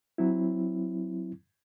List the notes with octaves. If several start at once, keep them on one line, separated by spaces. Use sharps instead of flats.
F#3 C4 E4